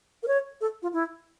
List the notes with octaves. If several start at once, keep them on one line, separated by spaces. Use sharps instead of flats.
A#4
C#5
A4
F4
E4